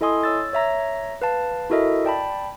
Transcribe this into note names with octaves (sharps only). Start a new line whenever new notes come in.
E4 A4 D#5 G#5 C6 D#6
C#5 E6 A6
C#5 E5 A#5 A#6
B4 F5 A5
E4 F#4 A4 A#4 D#5 E5
D5 G5 A5 B5